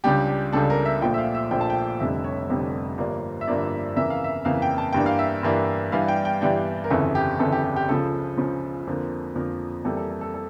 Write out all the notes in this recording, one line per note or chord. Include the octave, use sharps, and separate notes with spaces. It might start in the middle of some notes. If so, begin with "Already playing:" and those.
C#2 C#3 G3 D4 G4
G4
C#2 C#3 G3 D4 A4
A#4
E5
A#1 A#2 F3 A3 G5
E5
F5
E5
A#1 A#2 F3 A3 G5
A5
G5
F1 F2 D3 G3 E5
C#5
F1 F2 D3 G3
G1 G2 F3 A#3 D4
E5
G1 G2 F3 A#3 D4 D5
F2 C#3 E3 A#3 E5
F5
E5
F2 C#3 E3 A#3 F5
G5
A5
G2 E3 A#3 D4 G5
F5
E5
G2 E3 A#3 D4
G2 E3 G3 D4 F5
G5
G5
G2 E3 G3 D4 G5
A#4
G1 F2 C#3 E3 A4
G4
G1 F2 C#3 E3 A4
G4
G4
G4
C#2 C#3 F3 A4
C#2 C#3 F3
F2 D3 F3 A#3
F2 D3 F3 A#3 A#4
F2 E3 G3 A#3 A4
A4
A4
A4
A4